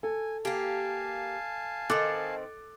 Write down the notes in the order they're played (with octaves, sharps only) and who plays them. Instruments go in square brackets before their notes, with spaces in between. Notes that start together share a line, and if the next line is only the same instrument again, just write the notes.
[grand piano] A4 [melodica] G#5
[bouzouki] A#3 G4 [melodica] F5 G#5 A5
[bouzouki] D#3 C4 [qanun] A4 [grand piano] D#5 D6 F#6